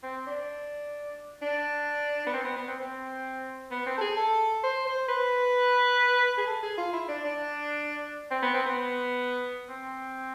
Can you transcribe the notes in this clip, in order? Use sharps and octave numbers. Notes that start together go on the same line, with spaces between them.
C4
D4
D4
B3
C4
B3
B3
C4
C4
B3
C4
A4
G#4
A4
C5
C5
B4
G#4
A4
G#4
F4
E4
D4
D4
C4
B3
C4
B3
C4